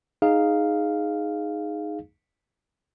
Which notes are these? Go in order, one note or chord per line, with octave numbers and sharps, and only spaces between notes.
D#4 G#4 F5